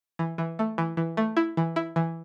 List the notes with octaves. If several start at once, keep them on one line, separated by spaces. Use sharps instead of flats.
E3
E3
A3
E3
E3
A3
E4
E3
E4
E3